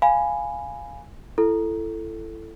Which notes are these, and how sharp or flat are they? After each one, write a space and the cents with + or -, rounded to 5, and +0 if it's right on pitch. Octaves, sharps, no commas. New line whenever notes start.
F5 +0 G#5 +0 B5 +0
E4 +25 A4 +0